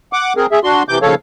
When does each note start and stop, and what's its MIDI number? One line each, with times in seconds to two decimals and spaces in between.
0.13 0.33 78
0.13 0.33 86
0.37 0.46 60
0.37 0.46 68
0.37 0.46 70
0.52 0.59 68
0.52 0.59 76
0.64 0.83 62
0.64 0.83 66
0.64 0.83 84
0.89 0.99 48
0.89 0.99 52
0.89 0.99 86
0.89 0.99 91
1.02 1.15 39
1.02 1.15 49
1.02 1.15 53
1.02 1.15 69
1.02 1.15 73
1.02 1.15 77